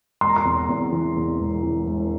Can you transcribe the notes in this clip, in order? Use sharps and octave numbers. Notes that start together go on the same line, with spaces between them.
E1 C6
A#5
C6
E2
E2
E3
E2
E1
E3
E1